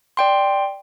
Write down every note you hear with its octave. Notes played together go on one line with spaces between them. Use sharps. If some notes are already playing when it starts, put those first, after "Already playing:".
D5 G5 C6